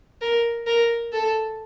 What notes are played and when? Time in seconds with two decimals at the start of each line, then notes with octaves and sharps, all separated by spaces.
0.21 A#4
0.67 A#4
1.13 A4